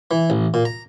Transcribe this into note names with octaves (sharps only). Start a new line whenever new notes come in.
E3
A1
A#2
A#5